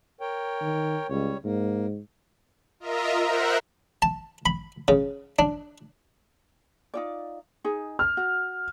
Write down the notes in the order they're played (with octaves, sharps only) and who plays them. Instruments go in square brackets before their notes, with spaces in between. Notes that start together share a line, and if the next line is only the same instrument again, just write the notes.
[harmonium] A#4 C#5 G5
[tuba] D#3
[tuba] C#2 [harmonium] G3 C#5
[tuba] G#2 [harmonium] A#3
[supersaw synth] F4 A#4 D#5 E5 A#5
A#4 C5 E5 F#5 F#6
[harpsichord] A5
B5
C#3
D4
[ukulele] D#4 F4 D5
D#4 G#4
[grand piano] F6
[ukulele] F#4